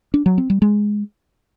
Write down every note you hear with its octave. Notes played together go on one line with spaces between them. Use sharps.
D4
F#3
C4
G3
G#3